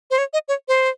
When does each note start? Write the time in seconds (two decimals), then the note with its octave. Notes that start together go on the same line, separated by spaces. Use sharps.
0.11 C5
0.18 C#5
0.33 D#5
0.48 C#5
0.68 C5